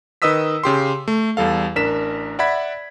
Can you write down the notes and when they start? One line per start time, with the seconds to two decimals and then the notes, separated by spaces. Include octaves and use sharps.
0.22 D#3 B4 D#5 D#6 E6 B6
0.64 C#3 G4 C6
1.08 A3
1.37 E2 G3 A4 F5
1.76 A1 D4 A#4 B6 E7
2.39 D5 E5 F#5 B5 G#6 B6